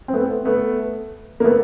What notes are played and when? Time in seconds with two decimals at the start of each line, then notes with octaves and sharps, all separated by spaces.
0.08 C4
0.13 A3 B3
0.45 A3 B3
1.40 A#3
1.44 A3 B3